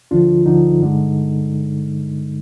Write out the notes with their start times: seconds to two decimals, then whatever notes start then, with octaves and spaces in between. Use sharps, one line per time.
0.11 D2 D3 F3 D4 F4
0.46 D2 D3 F3 D#4
0.80 G2 D3 G#3